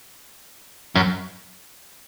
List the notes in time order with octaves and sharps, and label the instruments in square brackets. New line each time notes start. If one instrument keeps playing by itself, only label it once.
[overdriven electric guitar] F#2